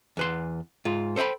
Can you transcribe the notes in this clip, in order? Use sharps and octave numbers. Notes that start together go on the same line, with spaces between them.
E2 B4 C6
G#2 F4
A4 C5 D#5 G5 B5